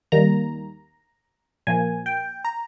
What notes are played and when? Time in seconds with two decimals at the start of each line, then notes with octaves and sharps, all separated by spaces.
0.12 D#2 D#3 G3 A#3 A#5
1.67 A#2 F3 A#3 G#5
2.06 G5
2.45 A#5